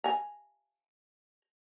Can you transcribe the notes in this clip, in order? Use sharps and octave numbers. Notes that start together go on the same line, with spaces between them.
G#5 A#5